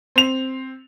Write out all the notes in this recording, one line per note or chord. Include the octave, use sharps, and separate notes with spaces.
C4 F7